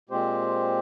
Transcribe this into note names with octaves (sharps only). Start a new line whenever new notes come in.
A#2 G#3 C4 G4 C5